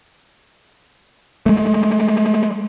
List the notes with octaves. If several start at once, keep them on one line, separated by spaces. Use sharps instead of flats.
G#3 A3